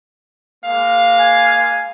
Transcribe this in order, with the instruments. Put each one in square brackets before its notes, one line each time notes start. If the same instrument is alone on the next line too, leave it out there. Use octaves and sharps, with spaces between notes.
[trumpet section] G#3 A#3 F5
[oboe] G#5